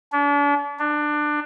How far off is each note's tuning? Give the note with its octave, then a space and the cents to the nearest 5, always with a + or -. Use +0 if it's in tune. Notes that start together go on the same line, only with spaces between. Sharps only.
D4 -40
D4 +20